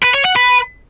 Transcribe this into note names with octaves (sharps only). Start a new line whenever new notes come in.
B4
C#5
F#5
B4